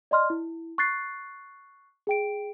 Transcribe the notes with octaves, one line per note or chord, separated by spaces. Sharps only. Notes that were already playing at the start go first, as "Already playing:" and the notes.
D5 D#5 C6 F6
E4
C#6 F#6 A6 C7
G#4 G5 D7